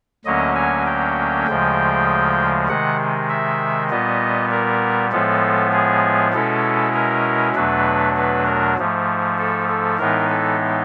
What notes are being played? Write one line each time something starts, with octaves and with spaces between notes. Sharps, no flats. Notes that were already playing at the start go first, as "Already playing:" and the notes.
D2 D3 F#3 A#3 C#4 D#5
G#5
G5
D2 C#3 F3 G#3
C3 D#3 G#3 F#5
E5
A#2 G3 B3 D#5
A#4
A2 F3 G#3 B3 A4
G#4
B2 G#3 C#4 E4 A4
A#4
E2 B2 F#3 A3 D4 B4
B4
A#4
G#2 F3 A3
A4
A4
A2 E3 G#3 B3 D#4 A#4
A4